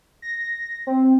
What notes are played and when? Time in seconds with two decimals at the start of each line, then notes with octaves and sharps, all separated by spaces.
0.22 A#6
0.87 C4